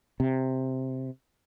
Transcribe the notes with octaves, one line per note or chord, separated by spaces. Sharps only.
C3